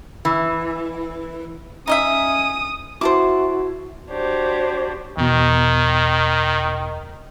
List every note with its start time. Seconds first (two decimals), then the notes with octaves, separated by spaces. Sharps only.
0.25 E3
1.87 C#4 D#4 D#5 E5 D#6
3.01 E4 F#4 C5 A5 D6
4.11 D4 F#4 G4 C5 C#5
5.17 E2 B2 D#3